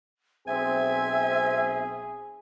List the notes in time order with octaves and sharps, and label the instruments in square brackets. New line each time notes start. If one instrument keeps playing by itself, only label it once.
[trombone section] B1 C4 [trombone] G#4 [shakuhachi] E5 [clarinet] G#5